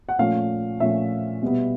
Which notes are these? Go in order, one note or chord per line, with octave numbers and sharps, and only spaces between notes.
F#5
A#2 F3 A3 C#4 F5
A#2 F3 A3 C#4 E5
B2 G3 B3